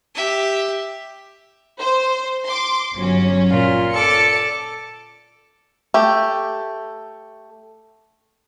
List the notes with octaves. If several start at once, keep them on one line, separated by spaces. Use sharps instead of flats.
G4 E5
C5
C6 D6
G1 F#3 C#4
A#2 F4
A4 D5 C#7
A3 G4